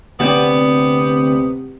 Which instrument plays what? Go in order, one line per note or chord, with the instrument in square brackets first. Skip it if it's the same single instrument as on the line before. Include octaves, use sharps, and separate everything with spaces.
[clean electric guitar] D2 C4 D5 [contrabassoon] C3 [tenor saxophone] B3